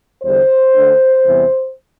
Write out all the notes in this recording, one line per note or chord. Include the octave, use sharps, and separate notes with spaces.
E2 D3 G3 C5
D3 A3 D4
E2 C3 E3 G3 B3